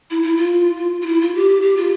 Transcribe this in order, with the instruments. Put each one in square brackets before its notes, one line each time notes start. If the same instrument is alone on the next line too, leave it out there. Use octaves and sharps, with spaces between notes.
[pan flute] E4
E4
F4
F4
E4
F4
G4
G4
F4